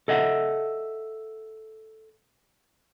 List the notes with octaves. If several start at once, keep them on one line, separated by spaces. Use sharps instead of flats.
A4 D#5 E5 F#5